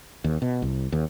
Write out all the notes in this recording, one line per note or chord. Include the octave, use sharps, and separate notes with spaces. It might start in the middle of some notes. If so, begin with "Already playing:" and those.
D#2
B2
C2
D#2